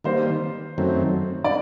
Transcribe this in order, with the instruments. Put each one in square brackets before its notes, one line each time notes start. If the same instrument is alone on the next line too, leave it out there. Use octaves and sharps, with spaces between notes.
[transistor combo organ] D#3 G3 A#3 [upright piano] C5
[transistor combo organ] F#2 D#3 F#3 A3 C4
[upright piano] D5